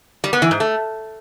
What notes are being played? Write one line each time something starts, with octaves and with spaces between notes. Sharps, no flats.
G3
B3
E3
G#2
A3